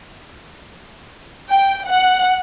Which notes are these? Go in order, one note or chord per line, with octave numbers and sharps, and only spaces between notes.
G5
F#5